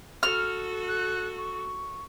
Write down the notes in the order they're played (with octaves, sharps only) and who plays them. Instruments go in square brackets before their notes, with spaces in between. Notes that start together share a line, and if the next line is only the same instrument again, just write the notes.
[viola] F#4 A4 [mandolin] F6
[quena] F#6
C#6